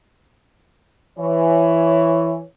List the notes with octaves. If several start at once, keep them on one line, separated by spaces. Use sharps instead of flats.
E3 C#5